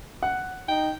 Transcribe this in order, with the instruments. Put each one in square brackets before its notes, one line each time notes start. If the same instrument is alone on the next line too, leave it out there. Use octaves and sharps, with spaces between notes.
[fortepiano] F#5
[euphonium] D#4 [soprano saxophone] G5